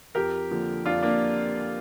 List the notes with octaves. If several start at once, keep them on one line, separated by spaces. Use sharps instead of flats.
F2 G4 A#4
D3 F3 A#3
F2 D4 F4
A#3 D4